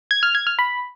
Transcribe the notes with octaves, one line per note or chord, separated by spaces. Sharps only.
G#6
F6
G#6
F6
B5